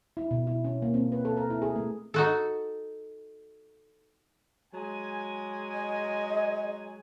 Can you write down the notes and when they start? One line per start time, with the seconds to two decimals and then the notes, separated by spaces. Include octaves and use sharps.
0.17 E4
0.31 B2
0.47 E4
0.64 C#4
0.82 A#3
0.94 C4
1.12 B4
1.25 A4
1.37 A#4
1.50 E4
1.62 G#4
1.76 A3
2.14 D#4 F#4 A4
4.73 F#3 G#3 G#5
5.74 D#5